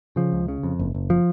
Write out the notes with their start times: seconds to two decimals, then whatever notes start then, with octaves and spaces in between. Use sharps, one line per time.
0.16 C#3 F3
0.33 C#2
0.48 C#3
0.63 F2
0.79 F#1
0.94 F#1
1.10 F3